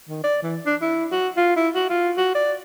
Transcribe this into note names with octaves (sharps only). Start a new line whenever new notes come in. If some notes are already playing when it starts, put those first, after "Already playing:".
D#3
D5
E3
D4
E4
F#4
F4
E4
F#4
F4
F#4
D5